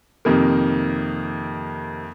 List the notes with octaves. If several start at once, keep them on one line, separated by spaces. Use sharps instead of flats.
F2 C3 D#3 A#3